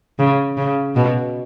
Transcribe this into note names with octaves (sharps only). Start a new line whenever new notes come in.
C#3
C#3
B2